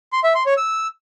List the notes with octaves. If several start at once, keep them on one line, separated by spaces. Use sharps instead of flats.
C6
E5
C6
C#5
E6